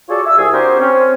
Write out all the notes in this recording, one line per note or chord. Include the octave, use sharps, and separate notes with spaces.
F4 F#4 G#4 A4 C#5 D5
E5 E6
C2 G#4
C4 D4 F#4 G4 A#4 C5
C4 C#4